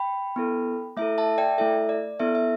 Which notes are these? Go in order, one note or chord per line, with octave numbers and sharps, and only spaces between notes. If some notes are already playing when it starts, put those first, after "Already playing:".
Already playing: G5 B5
B3 E4 A4
A3 E4 A4 E5
E5 A5
D5 G5
A3 E4 A4 E5
D5
B3 E4 A4 E5
E5